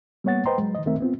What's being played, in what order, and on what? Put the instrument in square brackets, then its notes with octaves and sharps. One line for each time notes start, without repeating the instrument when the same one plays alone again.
[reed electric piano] G3 A#3 B3 C#5 F#5 A6
B4 C5 D#5 G5 A#5 C6
F#3 G#3
D#3 D#5
C2 D#3 A3 C4 A#4 E5
B3 C4 F4